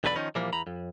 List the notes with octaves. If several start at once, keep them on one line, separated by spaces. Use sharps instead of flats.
B1 E2 D3 B4 D5 B5
D#3 F3 C#4 D#4
A#2 E3 F3 G3 A#3
E2 A#5 B5
F2